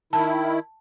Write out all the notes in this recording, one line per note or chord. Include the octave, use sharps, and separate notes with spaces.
D#3 E4 A5